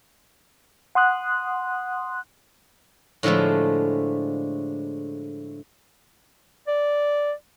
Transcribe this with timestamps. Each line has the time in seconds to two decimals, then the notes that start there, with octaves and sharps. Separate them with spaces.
0.95 F#5 C6 D#6 F#6
3.23 A2 D3 F3 G#3 A3
6.67 D5